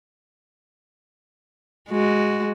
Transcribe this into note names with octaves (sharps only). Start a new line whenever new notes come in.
G#3 F#4